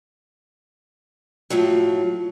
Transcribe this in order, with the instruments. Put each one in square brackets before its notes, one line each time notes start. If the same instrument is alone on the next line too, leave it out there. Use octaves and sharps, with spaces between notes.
[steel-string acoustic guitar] A2 F3 F#3